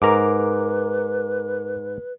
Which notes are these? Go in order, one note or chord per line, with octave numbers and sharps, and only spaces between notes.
G#2 A#4 B4 A#5 D6